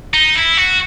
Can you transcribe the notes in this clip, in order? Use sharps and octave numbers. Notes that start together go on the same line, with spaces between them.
D#4
E4
F#4